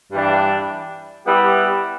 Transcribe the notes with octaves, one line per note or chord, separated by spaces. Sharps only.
G2 E3 G3 D4
G3 B3 E4 G4